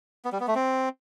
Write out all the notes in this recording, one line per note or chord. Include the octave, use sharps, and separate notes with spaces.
B3
G3
B3
A3
C4